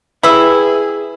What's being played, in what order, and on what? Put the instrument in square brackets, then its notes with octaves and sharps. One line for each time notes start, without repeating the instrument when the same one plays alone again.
[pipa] G3 E4 [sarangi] G#4 [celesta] B4 [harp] E6